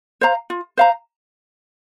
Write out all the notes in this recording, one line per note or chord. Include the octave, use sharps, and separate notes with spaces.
C5 F5 A#5
F4
C5 F5 A#5